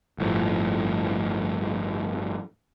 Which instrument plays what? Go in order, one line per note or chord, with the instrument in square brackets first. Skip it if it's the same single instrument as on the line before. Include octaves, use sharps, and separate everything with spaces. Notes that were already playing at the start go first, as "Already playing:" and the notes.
[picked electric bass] G1 A2 F3